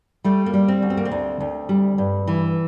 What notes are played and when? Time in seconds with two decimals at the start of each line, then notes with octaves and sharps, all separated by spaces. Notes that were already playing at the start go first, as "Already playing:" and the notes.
0.24 G3 A3
0.46 A#3
0.53 G3
0.68 C4
0.82 D2
0.90 C4
0.97 A#3
1.05 C4
1.11 D2
1.40 D2
1.69 G3
1.98 G2
2.27 E3